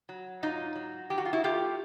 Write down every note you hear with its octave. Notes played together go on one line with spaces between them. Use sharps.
F#3
G#2 D#4 F4
F#3
D#3 G4
F#4
F4
E4 F#4
A3 F4 G4